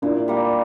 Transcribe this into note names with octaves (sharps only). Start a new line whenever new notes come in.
A#2 D4 E4
G3 A#3